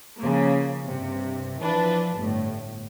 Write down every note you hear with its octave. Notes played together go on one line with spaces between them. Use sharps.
C#3 F3 A#3
G2 C3
E3 F3 D4 B4
G1 A2